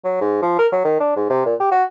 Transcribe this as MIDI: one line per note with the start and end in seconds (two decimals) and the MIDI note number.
0.04 0.16 54
0.21 0.41 44
0.42 0.59 53
0.59 0.67 70
0.72 0.83 54
0.84 0.99 51
1.00 1.12 62
1.16 1.30 44
1.30 1.42 48
1.46 1.54 46
1.60 1.71 67
1.71 1.84 66